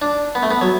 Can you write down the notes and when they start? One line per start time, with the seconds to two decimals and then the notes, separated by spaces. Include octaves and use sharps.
0.02 D4
0.35 B3
0.43 A3
0.51 B3
0.61 F#3